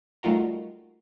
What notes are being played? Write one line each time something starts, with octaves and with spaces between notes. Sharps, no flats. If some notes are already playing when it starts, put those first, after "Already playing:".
G3 A3 D#4 F4 F#4 A#4